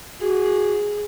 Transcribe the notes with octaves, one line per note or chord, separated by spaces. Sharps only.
F#4 G#4